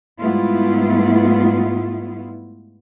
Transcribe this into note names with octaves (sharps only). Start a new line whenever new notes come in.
G#2 G3 A3 B3 E4 F4